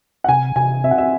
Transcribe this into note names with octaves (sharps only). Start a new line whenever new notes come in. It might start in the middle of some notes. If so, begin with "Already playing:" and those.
F#5
C3 G#5
C3 G#5
C4 E5
F#5
E5